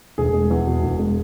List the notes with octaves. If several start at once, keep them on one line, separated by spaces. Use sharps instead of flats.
E1 G#4
G#3
E2
B2
E1
G#3